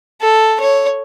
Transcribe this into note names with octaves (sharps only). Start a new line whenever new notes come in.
A4
C#5